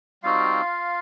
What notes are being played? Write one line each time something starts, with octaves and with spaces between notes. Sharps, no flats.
G3 C4 D#4 F4 F#4 F5